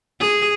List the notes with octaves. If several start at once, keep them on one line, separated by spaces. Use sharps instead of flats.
G#4